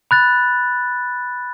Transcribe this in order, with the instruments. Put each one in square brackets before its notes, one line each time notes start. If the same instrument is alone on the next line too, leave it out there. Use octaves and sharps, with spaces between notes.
[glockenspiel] B5 F#6 A6